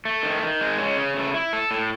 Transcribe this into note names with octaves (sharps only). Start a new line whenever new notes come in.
A3
D#3
D#3
G#3
C#4
C#3
A3
E4
A4
A2